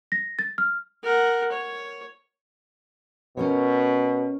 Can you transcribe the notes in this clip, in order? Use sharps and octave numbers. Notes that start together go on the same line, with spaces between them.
A#6
A6
F6
A#4 F#5
C#5
B2 C#4 A#4 C#5